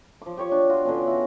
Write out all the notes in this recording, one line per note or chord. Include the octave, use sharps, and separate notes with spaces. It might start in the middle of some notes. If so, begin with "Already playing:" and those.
F3 D6
G4 C#5 C#6
D4
F4 F#4
D3 B3 C#4
E4 F#4